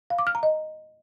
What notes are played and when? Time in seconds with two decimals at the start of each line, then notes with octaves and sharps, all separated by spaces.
0.10 F5
0.19 D6
0.27 F6
0.35 A#5
0.43 D#5